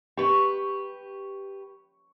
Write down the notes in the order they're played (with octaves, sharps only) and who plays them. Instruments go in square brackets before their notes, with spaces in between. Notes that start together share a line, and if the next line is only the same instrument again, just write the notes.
[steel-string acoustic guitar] G4 B4 [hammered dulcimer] C#6